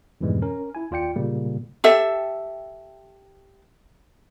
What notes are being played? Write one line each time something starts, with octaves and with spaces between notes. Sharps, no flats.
F2 G#2 B2 E3 G3 G#3
C#4 A#4
E4 G#5
D#2 F4 D5 G5 C#7
A#2 C#3 G3 A#3
G4 A4 E5